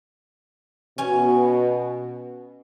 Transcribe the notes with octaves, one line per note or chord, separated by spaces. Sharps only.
B2 C#4 G#5